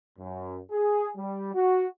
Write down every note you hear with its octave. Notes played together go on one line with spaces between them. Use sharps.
F#2
G#4
G3
F#4